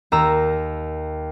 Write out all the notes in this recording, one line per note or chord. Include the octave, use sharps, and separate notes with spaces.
D#2 A#5 E6